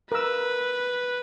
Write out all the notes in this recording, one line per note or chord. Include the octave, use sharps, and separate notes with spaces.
A#4 B4 E6